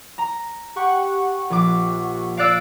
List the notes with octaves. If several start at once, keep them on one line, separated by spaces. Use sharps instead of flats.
A#5
G4 F#5 C#6
A#1 D6
D5 F5 E6 F#6 D7